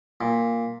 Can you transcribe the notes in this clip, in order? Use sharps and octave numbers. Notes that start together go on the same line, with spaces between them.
A#2